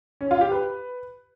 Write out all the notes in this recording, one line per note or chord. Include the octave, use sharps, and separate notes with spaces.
C#4
F4
G4
B4